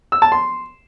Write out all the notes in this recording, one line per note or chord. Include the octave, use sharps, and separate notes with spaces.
E6
A5
C6